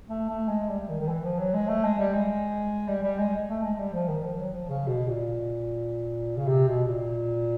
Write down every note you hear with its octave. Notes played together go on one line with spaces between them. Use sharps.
A3
A3
G#3
G3
D#3
D#3
E3
F3
F#3
G#3
A3
G#3
G3
G#3
G3
G3
G#3
A3
G#3
G3
F3
D#3
F3
F#3
F3
C#3
B2
A#2
C#3
C3
B2
A#2